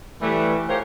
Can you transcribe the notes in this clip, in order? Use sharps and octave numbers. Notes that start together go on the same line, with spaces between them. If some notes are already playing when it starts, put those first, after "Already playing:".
E3 G3 A3
F4 G4 G#4 A#4 C5 C#5